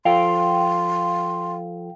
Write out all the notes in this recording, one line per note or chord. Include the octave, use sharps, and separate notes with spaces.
F3 F4 A4 F5 G5 C6